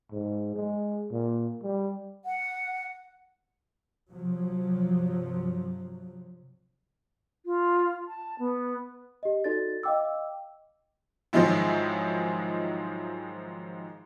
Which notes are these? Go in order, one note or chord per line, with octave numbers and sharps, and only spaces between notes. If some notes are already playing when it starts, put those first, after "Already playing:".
G#2
G#3
A#2
G3
F#5
G2 C3 F3 F#3
F4
A5
B3
G4 D#5
D#4 F#4 A4 D5 A6
D#5 F5 G5 D6 E6
G#2 D#3 F3 F#3 G#3 E4